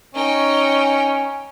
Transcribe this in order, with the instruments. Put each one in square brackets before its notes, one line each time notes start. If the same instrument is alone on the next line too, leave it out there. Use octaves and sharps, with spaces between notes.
[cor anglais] C#4 [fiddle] D#4 G5